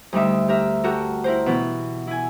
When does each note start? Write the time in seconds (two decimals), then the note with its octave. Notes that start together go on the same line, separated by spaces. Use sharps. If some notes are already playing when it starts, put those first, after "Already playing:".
0.13 D2 G3 D#4 E5
0.48 G4 A#4 E5
0.84 F#4 G4 A4 A#4
1.24 E4 A#4 C5
1.46 B2 E3
2.07 E4 G#5